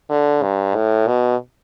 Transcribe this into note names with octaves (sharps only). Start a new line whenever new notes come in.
D3
G2
A2
B2